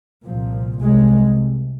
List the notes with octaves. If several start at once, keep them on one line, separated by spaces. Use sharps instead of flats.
C2 A#2 F3
C2 C3 G#3